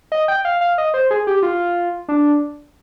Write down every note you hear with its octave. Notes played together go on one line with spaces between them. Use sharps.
D#5
G5
F5
F5
D#5
C5
G#4
G4
F4
D4